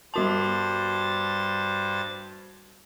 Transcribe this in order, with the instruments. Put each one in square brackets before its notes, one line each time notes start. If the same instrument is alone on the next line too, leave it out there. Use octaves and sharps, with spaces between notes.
[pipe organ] G2 C5 A6 [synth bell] G3 F#4 A5